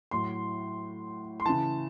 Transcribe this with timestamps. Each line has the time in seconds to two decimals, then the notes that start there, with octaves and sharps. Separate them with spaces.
0.11 A2 F#3 C6
1.40 C6
1.45 C#3 E3 A5